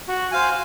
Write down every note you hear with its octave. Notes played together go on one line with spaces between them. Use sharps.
F#4
C5 F5 G#5